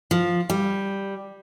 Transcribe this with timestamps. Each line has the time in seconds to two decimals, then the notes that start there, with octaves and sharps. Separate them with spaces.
0.11 F3
0.50 G3